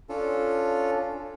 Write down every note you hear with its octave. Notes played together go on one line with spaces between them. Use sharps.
C#4 D4 F4 A4